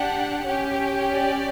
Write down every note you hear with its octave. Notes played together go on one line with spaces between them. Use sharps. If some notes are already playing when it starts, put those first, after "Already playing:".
Already playing: D4 G4 F#5
C#4 G4
D5